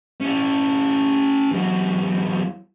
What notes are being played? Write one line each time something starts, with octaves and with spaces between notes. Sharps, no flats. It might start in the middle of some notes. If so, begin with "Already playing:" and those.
C#4 E4
E2 F#3